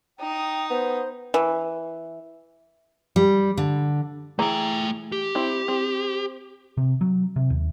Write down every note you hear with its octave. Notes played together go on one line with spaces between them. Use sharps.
D#4 G5 D#6
B3 C5
E3
G3
D3
E3 A3 G#4 G5 A#5
G4
C4 E4
C4
C3
F#3
C3
D#2